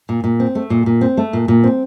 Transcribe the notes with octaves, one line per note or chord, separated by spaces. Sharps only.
A#2
A#2
C4
A3
A#2
A#2
C4
A3
A#2
A#2
C4